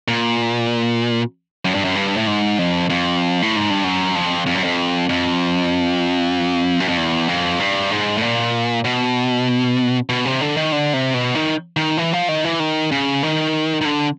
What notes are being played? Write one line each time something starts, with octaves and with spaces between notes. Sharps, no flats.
A#2
F#2
G2
F#2
G2
A2
G#2
F2
F2
A2
G#2
G2
F#2
F2
F2
F#2
F2
F2
F#2
F2
E2
F2
G2
G#2
A2
A#2
B2
B2
C3
D3
D#3
D3
C3
B2
D#3
D#3
E3
F3
D#3
E3
D#3
C#3
D#3
D#3
D3